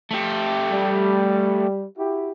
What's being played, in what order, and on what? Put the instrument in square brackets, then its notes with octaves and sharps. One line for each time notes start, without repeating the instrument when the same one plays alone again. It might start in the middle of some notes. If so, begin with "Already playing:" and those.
[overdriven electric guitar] A3 G4
[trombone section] G3
E4 F#4 G4